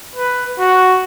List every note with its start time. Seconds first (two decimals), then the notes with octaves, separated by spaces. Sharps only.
0.16 B4
0.59 F#4